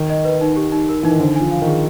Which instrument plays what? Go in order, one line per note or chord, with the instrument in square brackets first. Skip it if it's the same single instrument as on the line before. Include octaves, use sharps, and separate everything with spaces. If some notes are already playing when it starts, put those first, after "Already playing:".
Already playing: [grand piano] D#3
[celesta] D#5
B4
D#4
G4
D#4
A#4
[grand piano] E3 [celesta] D#4
[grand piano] D#3
[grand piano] D3 [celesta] C5
[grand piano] F3 [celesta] G#5
[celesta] F5
[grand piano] D#3
[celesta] G#4